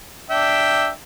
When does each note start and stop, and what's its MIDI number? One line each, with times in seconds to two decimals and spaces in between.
0.30 0.90 62
0.30 0.90 76
0.30 0.90 79